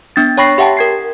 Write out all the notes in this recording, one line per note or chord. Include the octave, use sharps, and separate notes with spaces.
B3 D4 A6
C#5 G5 B5 C#6 A#6 C7
G4 E5 F#5 G5 A5
A#4 G#6 C7